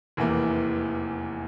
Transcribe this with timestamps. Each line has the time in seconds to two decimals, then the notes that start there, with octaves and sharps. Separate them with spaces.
0.17 F1 E2 E3 A#3